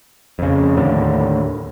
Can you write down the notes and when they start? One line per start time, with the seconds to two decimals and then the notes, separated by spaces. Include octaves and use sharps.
0.39 F2 C#3
0.77 D#2 A2 D3